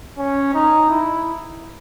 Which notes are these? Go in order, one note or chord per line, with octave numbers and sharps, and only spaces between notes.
C#4
D#4
E4